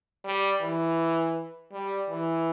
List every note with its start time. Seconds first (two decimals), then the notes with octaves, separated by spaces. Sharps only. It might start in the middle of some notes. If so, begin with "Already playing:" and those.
0.24 G3
0.61 E3
1.73 G3
2.10 E3